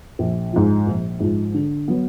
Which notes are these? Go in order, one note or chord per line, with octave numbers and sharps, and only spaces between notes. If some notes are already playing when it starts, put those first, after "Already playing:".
A#1
G#2 F3
A#1
G#2 F3
D3
F#3 B3